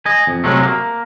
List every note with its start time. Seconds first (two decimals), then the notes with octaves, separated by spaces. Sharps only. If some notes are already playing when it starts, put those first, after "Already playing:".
0.06 D#5 G#5
0.27 F2
0.44 C3 F#3 G#3 A3
0.63 A#3